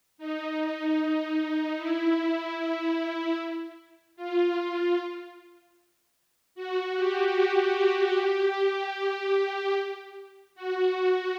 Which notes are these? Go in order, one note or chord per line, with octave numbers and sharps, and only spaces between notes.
D#4
E4
F4
F#4
G4
G4
F#4